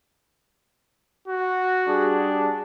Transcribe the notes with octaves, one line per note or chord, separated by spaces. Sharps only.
F#4
G3 D4 G#4